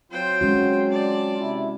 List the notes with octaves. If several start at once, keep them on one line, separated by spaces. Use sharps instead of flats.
F#3 C4 F4 C5 G5
G#3 C#4 F#4
D5 A5
C3 E4